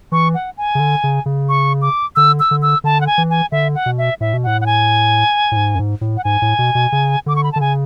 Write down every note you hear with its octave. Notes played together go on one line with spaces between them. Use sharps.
E3 C#6
F#5
G#5
C#3
D3
C#3
C#3
C#6
D6
D3 E6
E6
D3
E6
D3 A5
F#5
G#5
E3
G#5
D3 E5
F#5
B2
E5
A2 E5
B2
A2 F#5
F#5
G#5
A2
G#2
F#2
G#2
A2
F#5
G#2 G#5
A2
B2
B2
C#3
D3 D6
C#6
B5
A5
D3
C#3 G#5